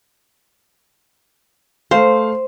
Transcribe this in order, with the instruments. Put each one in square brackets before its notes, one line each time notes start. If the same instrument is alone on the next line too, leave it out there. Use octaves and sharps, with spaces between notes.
[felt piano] A3 F5 [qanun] C5